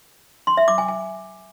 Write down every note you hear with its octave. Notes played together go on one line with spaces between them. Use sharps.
C6
E5
D6
G#5
G#5